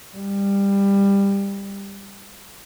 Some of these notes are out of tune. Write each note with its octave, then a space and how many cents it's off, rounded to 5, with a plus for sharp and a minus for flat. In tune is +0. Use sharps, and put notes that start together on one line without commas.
G3 +20